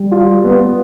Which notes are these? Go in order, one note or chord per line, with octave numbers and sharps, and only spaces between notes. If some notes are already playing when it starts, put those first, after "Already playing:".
Already playing: G3
F4
B3